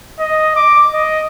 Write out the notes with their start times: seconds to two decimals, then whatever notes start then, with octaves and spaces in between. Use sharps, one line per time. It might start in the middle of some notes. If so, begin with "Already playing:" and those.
0.20 D#5
0.56 D6
0.93 D#5